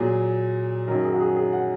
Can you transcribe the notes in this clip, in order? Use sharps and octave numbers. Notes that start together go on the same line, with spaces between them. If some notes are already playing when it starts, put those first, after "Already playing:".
Already playing: A#2 F#3 G#4
F#2 D#3 F#3 A#4
G#4
F#4
G#4
G#4
F#5